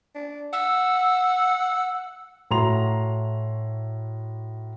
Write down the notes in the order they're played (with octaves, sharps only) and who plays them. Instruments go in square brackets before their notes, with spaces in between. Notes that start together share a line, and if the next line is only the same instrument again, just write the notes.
[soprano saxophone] D4
[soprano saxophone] F#5 [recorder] E6
[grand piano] A2 E4 F#4 A#5 C6 F7